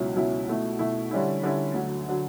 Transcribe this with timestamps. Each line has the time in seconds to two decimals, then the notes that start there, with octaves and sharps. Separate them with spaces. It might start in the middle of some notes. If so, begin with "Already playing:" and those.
Already playing: C#2 B2 F#3 C#4 E4
0.16 C#2 B2 F#3 C#4 E4
0.48 B2 A3 E4
0.79 B2 A3 E4
1.11 D3 G3 C#4 E4
1.43 D3 G3 C#4 E4
1.74 D2 D3 F#3
2.09 D3 F#3